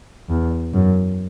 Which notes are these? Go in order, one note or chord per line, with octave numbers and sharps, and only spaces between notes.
E2
F#2